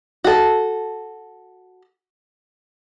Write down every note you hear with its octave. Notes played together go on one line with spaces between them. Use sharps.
F#4 A4